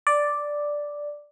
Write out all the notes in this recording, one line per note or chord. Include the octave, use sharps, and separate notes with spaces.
D5